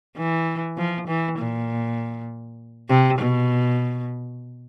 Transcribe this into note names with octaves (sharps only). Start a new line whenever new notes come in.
E3
F3
E3
A#2
C3
B2